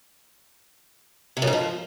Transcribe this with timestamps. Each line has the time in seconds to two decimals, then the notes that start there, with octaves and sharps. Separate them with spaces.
1.37 C3
1.42 F#2
1.47 G#2
1.53 F3